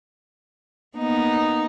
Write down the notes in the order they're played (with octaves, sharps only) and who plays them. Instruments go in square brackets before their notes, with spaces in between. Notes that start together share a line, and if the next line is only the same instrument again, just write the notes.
[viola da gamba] A#3 B3 D#4